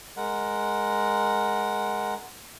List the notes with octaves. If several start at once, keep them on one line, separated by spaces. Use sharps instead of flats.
G#3 A#4 F#5